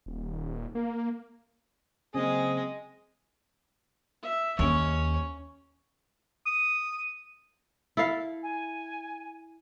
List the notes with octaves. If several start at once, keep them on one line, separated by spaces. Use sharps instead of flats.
D#1
A#3
C#3 F#3 G#3 A#3 C4 G#4 D#5
E5
D#2 C#4 C#5
D#6
E4 A4 F5
G#5